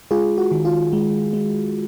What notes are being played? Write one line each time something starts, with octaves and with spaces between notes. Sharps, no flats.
G#3 F4 G#4
F#4
D#3
F4
G#3
G#3